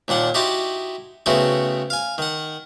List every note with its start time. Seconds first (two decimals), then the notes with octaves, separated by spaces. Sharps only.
0.08 D#2 A#2 D4 F#5
0.34 D#4 E4 F#4 G4 A5 C6
1.26 C#3 A3 B3 C4 E4 F#4
1.90 F5 G#5
2.18 D#3 F#5